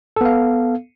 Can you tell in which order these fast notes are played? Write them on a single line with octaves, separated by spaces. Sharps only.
A4 B3 F5